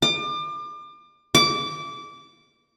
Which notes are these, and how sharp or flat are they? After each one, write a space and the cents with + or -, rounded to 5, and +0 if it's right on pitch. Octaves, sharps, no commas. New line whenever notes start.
D6 +35
D6 -20